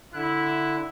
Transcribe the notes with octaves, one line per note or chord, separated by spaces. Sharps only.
D3 E4 F#6